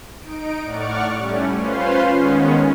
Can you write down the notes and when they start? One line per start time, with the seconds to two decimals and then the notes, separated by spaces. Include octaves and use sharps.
0.20 D#4 D7
0.64 A2 D5 F#5 C#6 D6 F6
1.15 G3 A3 C#4
1.55 C#4 F4 B4 C5 F5 C6
2.12 D#3 G#3 B3 C#4